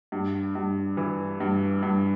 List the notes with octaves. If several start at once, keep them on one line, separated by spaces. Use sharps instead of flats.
G2
G2
E3
G2
G2